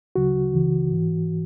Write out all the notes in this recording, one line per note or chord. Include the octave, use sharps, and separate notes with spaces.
D2 C#3 F#3 F#4
C#2 C#3 E3
G#2 E3